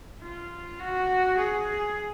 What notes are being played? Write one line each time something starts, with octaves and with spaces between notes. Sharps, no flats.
F4
F#4
G#4